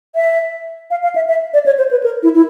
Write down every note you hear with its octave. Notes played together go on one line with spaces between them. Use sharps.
E5
F5
F5
E5
E5
D5
C#5
C5
B4
A#4
E4
E4